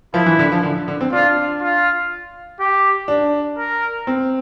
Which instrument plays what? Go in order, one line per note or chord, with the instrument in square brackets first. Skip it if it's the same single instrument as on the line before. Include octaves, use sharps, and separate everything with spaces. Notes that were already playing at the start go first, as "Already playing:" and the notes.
[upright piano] F3 [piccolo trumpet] E4
[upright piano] E3
D3
F3
D3
D3
C4
[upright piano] D4 [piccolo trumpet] F4
[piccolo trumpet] F4
G4
[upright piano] D4
[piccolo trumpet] A#4
[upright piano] C4